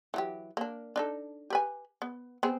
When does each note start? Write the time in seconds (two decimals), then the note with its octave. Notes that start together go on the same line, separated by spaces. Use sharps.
0.14 E3 F#3 G4
0.57 A#3 D4
0.96 D4 D#4 A4
1.50 G4 B4 G#5
2.02 B3
2.43 B3 C4 G#4